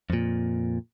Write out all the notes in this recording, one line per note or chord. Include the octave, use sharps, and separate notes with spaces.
F2 A#2